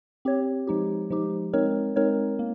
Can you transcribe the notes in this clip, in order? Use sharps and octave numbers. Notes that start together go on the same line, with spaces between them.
C4 G4 C#5
F3 G#3 D#4 G4
F3 G#3 D#4 G4
G#3 C4 D#4 A#4 C#5
G#3 C4 D#4 A#4 C#5
A#3